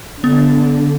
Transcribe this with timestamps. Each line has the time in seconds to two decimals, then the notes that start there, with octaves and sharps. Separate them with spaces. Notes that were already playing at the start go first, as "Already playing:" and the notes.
0.24 D3 B3